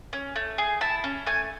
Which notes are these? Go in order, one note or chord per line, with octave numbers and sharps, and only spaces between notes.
C#4
A3
G#4
E4 A5
C#4
A3 G#5